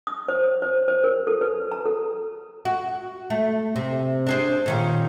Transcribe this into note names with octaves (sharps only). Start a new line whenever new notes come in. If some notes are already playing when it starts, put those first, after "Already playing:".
D#6
C5
C5
C5
A#4
A4
B4
A#5
A4
F#4
A3
C3
D4 G#4 C5
A#2 D#3 C#4